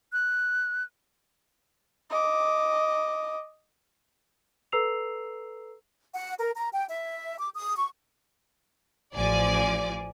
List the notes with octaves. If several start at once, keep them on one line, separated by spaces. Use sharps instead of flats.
F#6
D#5 D6
A4 B4 A#5 E6 C7 F7
F#5
A#4
A#5
G5
E5
D6
D#6
C#6
A1 F3 D5 G#5